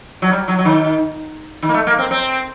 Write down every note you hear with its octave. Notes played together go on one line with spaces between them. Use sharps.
F#3
G3
F#3
F#3
D#3
D#3
A#3
A3
A#3
C4
C4